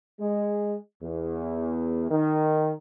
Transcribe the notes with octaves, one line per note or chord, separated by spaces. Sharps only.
G#3
E2
D#3